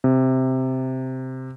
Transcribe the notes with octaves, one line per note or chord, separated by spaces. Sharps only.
C3